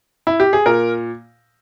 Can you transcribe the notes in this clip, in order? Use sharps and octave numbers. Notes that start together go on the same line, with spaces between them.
E4
G4
G#4
A#2 A#4